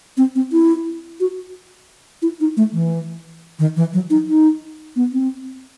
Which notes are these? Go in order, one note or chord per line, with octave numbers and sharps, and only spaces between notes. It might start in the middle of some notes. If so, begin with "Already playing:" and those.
C4
C4
E4
F#4
E4
D#4
A3
E3
D#3
E3
F#3
D#4
D#4
B3
C4